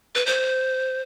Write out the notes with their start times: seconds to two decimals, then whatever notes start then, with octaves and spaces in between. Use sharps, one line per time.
0.15 B4
0.26 C5